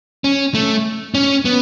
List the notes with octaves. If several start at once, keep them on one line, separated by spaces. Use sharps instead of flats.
C#4
A3
C#4
B3